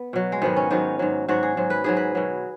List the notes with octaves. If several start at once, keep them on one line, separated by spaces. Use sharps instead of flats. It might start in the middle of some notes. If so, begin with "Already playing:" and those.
Already playing: B3
B2 F#3
G#3
G#2 D#3 F#3 B3
C#4
G#2 D#3 F#3 D#4
G#2 F#3
G#2 F#3 F#4
G#4
G#2 F#3
B4
G#2 F#3 G#4
B4
B2 F#3